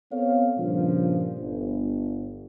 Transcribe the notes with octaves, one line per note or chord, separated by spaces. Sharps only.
B3 C4 A4 C#5 F5
G2 A#2 C#3 F3 G3 D4
G1